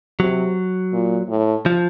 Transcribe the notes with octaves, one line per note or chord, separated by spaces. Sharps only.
C3 F#3
A#2
A2
F3